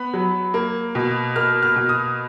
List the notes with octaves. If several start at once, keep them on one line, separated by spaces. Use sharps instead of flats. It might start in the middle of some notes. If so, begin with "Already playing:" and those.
Already playing: B3 B5
F#3
A#3
B2
A#3 F6
F6
B2
D#6